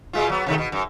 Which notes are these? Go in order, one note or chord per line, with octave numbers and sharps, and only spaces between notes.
B2 G#3 F4
F#3 B3
C3 D#3 A3
B2
F#2